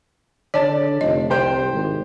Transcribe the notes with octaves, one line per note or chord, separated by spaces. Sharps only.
D3 C#5 D5 A5
F1 D#5
C2 G4 C5 G5
G#1